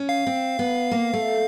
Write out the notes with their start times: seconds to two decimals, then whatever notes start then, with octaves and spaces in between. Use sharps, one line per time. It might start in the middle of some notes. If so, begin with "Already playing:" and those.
Already playing: C#4
0.09 F5
0.27 C4
0.59 B3
0.91 A#3
1.13 A3